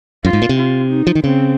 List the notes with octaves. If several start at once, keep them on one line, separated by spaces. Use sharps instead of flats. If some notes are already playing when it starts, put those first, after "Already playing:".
F#2 F4
G#2
A#2
C3
F4
D#4
F3
D#3
C#3 C4